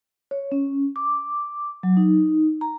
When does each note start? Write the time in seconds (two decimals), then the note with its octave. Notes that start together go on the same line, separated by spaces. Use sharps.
0.31 C#5
0.52 C#4
0.96 D6
1.83 F#3
1.97 D#4
2.61 A#5